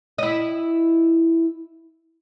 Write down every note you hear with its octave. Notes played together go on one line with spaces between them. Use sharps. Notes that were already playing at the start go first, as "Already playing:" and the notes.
E4 D#5